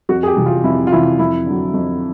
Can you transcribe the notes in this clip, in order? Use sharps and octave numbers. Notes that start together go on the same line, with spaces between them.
F2 F#4
G#4
G4
C3 E3 G3
F4
F2 E4
F4
C3 E3 G3 E4
F2 E4
D3 F#3
F2